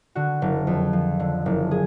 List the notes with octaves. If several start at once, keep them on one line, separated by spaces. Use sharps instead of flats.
D3 F#4
F#1
F2
F3
D3
F#1
G#4